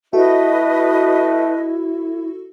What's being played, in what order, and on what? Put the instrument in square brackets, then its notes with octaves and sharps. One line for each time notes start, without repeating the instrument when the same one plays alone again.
[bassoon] A3 [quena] E4 [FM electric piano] F#4 A4 [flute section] B4 D#5